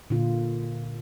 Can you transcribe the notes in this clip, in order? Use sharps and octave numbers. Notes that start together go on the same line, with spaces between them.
A#2 D3 F4